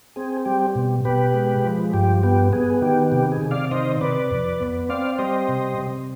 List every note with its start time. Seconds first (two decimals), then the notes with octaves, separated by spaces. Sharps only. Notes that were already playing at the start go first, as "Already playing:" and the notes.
0.16 C4 G#4
0.45 G3 G4
0.75 B2
1.05 B2 G4 B4
1.34 G#3
1.64 F3
1.93 G2 G4
2.23 B3 G4
2.53 B3 G#4
2.82 D#3 G4
3.12 C3 G4
3.32 G#4
3.41 C3
3.51 D5 F5
3.71 D#3 C5 D#5
4.01 C3 B4 D5
4.31 F2
4.60 B3
4.89 C4 D5 F5
5.18 G3 C5 D#5
5.49 C3
5.78 C3